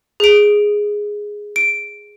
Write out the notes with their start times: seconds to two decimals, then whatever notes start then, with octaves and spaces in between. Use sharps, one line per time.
0.20 G#4 D7
1.56 D7